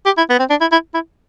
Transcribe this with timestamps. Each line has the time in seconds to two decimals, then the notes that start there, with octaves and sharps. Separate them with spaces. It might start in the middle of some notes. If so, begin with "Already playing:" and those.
0.06 G4
0.18 E4
0.30 B3
0.39 C4
0.50 D4
0.61 E4
0.72 E4
0.94 E4